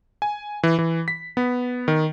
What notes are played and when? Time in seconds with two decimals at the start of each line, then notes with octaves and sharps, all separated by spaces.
0.22 G#5
0.63 E3
0.79 E3
1.08 B6
1.37 B3
1.88 D#3